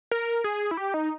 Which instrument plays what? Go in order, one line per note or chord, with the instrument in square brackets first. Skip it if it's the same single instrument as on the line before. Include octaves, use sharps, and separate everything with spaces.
[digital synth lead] A#4
G#4
E4
G4
D#4